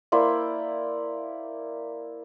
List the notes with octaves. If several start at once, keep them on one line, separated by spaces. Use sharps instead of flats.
A#3 E4 C5 D5